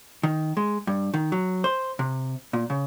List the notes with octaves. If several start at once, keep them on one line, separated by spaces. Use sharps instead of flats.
D#3
G#3
G2
D#3
F#3
C5
C3
A#2
C#3